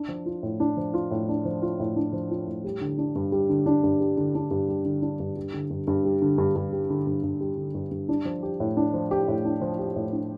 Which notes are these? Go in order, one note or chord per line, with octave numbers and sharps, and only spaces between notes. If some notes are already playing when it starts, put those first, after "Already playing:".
Already playing: D4
F3
F4
A2
D4
F3
F4
A2
D4
F3
F4
A2
D4
F3
F4
A2
G3
D3
D4
G2
G3
D3
D4
G2
G3
D3
D4
G2
G3
D3
D4
G2
G3
D3
G2
G2
G3
D3
G2
G2
G3
D3
G2
G2
G3
D3
G2
G2
D4
F3
G4
A2
D4
F3
G4
A2
D4
F3
G4
A2
D4